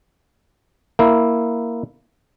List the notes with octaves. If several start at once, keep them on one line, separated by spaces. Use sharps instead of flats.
A#3 E4